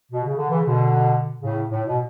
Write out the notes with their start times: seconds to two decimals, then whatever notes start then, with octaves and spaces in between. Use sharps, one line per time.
0.12 B2
0.24 C#3
0.37 D3
0.50 C#3 E3
0.65 B2 D3
1.41 A2 C#3
1.71 A2
1.87 B2